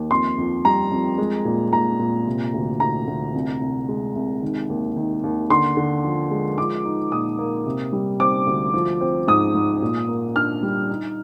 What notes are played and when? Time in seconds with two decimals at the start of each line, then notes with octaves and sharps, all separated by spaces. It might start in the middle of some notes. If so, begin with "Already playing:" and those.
Already playing: D#2
0.11 F2 C6
0.38 F2
0.65 G3 A#5
0.91 F2
1.18 G#3
1.45 A#2
1.73 A#2 A#5
1.99 A#2
2.27 C3
2.54 D2
2.80 D2 A#5
3.07 D2
3.34 C2
3.61 C2
3.89 G#3
4.15 C2
4.42 D#3
4.70 D#2
4.97 D#3
5.24 D#2
5.50 D3 C6
5.77 D3
6.04 F3
6.31 G#3
6.58 F3 D6
6.85 D#4
7.12 A#2 D#6
7.39 A#3
7.66 C3
7.93 G3
8.20 C4 D6
8.47 D2
8.74 F3
9.01 C4
9.28 G#2 D#6
9.55 G#2
9.82 A#2
10.08 A#3
10.35 D4 F6
10.63 G3
10.90 D#4